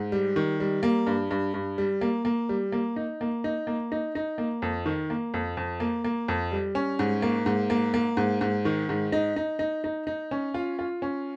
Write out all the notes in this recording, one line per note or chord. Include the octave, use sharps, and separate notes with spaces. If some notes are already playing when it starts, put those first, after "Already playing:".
Already playing: G#2
G3
D#3
G3
A#3
G2
G2
G2
G3
A#3
A#3
G3
A#3
D#4
A#3
D#4
A#3
D#4
D#4
A#3
F2
D#3
A#3
F2
F2
A#3
A#3
F2
G3
C#4
G#2
A#3
G#2
A#3
A#3
G#2
G#2
D#3
G#2
D#4
D#4
D#4
D#4
D#4
C#4
F4
F4
C#4